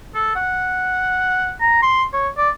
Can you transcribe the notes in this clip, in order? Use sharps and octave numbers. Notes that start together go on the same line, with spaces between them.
A4
F#5
A#5
C6
C#5
D5